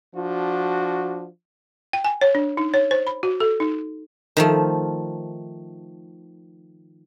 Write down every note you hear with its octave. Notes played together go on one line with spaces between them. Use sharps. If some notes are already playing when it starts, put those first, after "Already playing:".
F3 D4 F#4
G5
G#5
C#5
D4
D#4
C#5
C5
B5
F#4
A4
D#4
D#3 F3 A3